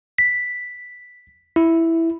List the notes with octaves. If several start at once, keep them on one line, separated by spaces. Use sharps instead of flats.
B6
E4